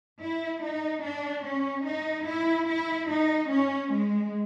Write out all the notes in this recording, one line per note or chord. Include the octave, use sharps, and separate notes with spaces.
E4
D#4
D4
C#4
D#4
E4
E4
D#4
C#4
G#3